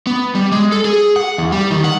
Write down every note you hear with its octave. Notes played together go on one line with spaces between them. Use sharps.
B3
G3
G#3
A4
G#4
F#5
E2
G3
D#3
F#5